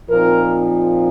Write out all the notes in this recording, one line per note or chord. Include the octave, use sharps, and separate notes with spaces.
A#2 F3 C4 D#4 A#4